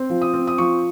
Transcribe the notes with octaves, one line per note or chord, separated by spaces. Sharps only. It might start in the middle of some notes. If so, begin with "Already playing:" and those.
Already playing: C4
F3
D#6
C4
D#6
F3 C#6